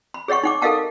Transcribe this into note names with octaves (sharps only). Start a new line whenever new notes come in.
B5
G#4 C#5 D#5 F#5 C#6
D#4 F#5 D6
A4 A#4 D#5 F5 F#5 A5